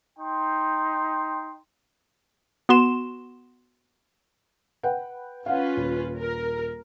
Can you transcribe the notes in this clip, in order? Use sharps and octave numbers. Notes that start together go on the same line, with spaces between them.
D#4 G5 C6
B3 F#4 C6 E7
B4 F#5 G5
C#4 F4 B4 F5 F#5
D#1
A#4